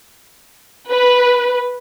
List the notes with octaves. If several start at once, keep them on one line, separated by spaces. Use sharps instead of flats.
B4